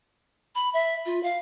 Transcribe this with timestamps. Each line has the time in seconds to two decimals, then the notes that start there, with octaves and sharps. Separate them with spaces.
0.55 B5
0.74 E5
1.06 F4
1.23 F5